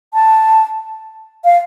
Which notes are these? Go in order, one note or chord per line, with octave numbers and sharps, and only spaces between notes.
A5
F5